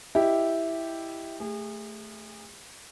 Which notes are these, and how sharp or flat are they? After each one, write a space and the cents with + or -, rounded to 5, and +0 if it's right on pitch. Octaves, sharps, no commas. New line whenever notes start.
E4 +0 G4 +0 D#5 +0
A3 +0 G#4 -35